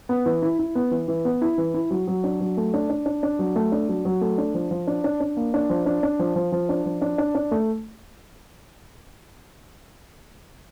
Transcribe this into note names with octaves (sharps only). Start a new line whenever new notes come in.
B3
E3
E4
E4
B3
E3
E3
B3
E4
E3
E4
F#3
F#3
D4
F#3
A3
D4
D4
D4
D4
F#3
A3
D4
F#3
F#3
A3
D4
F3
F3
D4
D4
D4
A#3
D4
F3
D4
D4
F3
F3
F3
D4
F3
D4
D4
D4
A3